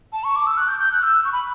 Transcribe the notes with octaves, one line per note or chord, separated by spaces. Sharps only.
A5
C#6
D6
E6
F#6
G6
G6
F#6
E6
C#6
B5